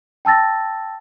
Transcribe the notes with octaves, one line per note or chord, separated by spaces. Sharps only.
G5 A5 E6 A6 A#6